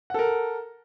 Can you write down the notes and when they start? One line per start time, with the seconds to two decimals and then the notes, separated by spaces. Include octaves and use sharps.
0.10 F#5
0.14 A4
0.19 A#4